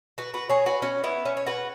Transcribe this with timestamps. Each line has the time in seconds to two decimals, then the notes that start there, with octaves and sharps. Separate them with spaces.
0.18 F#4 B4
0.34 F#4 B4
0.49 G#4 C#5
0.66 F#4 B4
0.82 C#4 F#4
1.04 B3 E4
1.25 C#4
1.37 C#5
1.46 F#4 B4